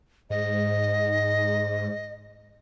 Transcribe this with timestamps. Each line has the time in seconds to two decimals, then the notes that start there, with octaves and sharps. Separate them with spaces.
0.30 G#2 D#5